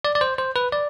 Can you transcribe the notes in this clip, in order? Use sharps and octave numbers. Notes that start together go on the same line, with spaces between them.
D5
D5
C5
C5
B4
D5